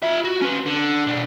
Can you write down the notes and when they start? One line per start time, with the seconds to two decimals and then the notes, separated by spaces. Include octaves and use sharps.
0.03 F4 E5
0.24 F#4
0.41 C#4 B4
0.66 D3
1.07 B2 D4